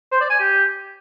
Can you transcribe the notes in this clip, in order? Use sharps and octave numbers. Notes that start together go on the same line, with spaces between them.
C5
D5
G#5
G4